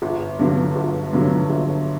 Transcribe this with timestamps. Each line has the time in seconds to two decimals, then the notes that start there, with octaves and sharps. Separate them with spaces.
0.02 G1
0.39 G2 D3 F#3
0.76 G1
1.13 G2 D3 F#3
1.50 G1